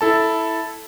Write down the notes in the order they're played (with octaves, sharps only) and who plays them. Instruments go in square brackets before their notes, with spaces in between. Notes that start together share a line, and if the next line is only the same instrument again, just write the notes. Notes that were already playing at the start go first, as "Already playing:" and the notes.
[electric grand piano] E4 A4 A5